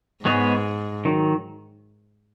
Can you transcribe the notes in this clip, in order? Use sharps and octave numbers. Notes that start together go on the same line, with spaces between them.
G#2 G#3 B3 G#4 C#5
D#3 F#3